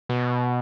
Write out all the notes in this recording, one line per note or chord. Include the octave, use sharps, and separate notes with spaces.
B2